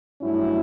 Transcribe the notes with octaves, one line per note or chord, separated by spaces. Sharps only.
G2 F#3 A3 C#4 E4